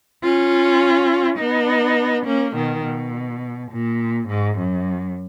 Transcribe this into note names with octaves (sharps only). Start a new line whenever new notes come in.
C#4 F4
B3 D#4
A#3 C#4
B2 D#3
B2
A#2
G#2
F#2